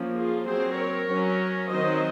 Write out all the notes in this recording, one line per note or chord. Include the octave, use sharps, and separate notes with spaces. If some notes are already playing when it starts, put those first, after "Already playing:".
Already playing: F3 A#3 C#4
F4 G#4
F#3 C4 G#4 C5
A#4 C#5
F#3 C#4
D#3 F#3 C4 C5 D#5